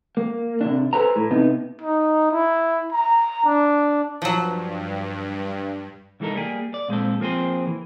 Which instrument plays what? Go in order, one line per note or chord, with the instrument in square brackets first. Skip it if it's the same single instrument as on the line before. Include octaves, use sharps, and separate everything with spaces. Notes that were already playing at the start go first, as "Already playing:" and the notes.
[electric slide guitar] A#3
C3 D4
G#4 A4 B4 C5 A#5
A2
C3 B3 D#4
[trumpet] D#4
E4
A#5
D4
[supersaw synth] G2 [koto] F3 F#3
[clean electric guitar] C2 E3 G#3 D#4 A4 A#4
G3 A#3 G#4
D5
A#2 G#3 C4 A4
F3 A#3 C4 G#4 C5
E3